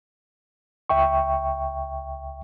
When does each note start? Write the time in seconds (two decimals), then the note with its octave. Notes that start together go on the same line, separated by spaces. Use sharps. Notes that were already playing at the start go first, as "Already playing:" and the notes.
0.89 C#2 E5 G5 C#6